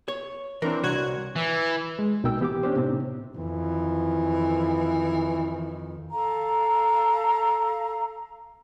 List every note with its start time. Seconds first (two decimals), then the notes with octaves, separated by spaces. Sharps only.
0.08 C#5
0.62 E3 C4 D4 A#4
0.84 C2 F#4 C#5 F#6 G#6
1.36 E3
1.99 G#3
2.23 C2 B2 D#4 A#4 G5 E6
2.40 E3 B3 G4 G5 D6
2.63 C#4 D4 G4 C5
2.76 A2 C3 B3 C4 D#4
3.37 F2 D#3 E3
6.11 A4 F5 A#5